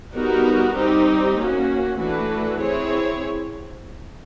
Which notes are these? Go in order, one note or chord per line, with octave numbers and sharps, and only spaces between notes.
G3 B3 D#4 F#4 A#4
G3 C4 D#4 G4
A#3 C#4 F#4
E3 A3 D4 F#4 B4
C4 E4 G#4 C#5